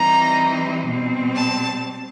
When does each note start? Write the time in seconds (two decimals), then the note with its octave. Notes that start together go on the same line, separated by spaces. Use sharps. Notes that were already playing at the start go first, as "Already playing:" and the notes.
Already playing: E3 G3 C4 D#4 A#5
0.87 B2 G3 C4
1.36 A5